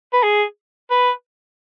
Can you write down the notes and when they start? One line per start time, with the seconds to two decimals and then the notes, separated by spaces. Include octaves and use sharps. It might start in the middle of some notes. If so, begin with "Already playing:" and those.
0.13 B4
0.23 G#4
0.90 B4